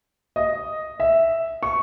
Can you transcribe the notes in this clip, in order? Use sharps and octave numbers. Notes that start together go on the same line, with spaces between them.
D#5
E5
C#6